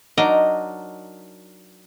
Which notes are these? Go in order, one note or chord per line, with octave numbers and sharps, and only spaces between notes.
F#3 D4 D#4 A#4 D#5